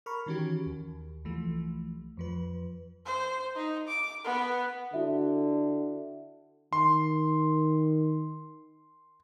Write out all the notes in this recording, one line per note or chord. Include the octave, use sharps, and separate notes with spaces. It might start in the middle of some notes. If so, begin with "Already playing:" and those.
A#4 A#5 B5 C#6 F6
D#3 E3 C#4 F#4 G4
D#2
C2 E3 F3 A3
F2 F3 B4
C5
D#4
D6
B3
D3 E4 F#4 E5
D#3 C6